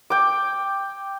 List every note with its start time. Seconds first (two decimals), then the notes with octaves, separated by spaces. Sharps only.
0.10 G5 D6